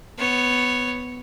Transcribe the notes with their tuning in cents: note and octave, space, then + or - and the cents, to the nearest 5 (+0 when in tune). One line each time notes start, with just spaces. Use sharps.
B3 +10 C#5 +0